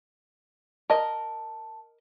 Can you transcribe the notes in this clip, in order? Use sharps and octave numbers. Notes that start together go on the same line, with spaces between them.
A#4 D#5 A5